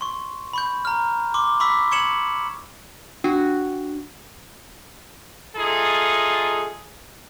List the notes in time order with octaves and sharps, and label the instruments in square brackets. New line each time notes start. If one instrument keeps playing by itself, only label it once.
[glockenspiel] C6 C#6
B5 C#6 G6
A#5 F6
C6 D6
B5 C#6 D6 E6 B6
C#6 G#6 C#7 E7 F#7
[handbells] D4 [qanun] F#4
[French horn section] A3 D#4 F4 G#4 A4